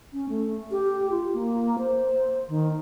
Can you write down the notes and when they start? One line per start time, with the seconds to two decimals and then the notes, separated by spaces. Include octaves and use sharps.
0.13 C#4
0.29 A3
0.71 G4
1.11 F4
1.34 A#3
1.79 C5
2.49 D#3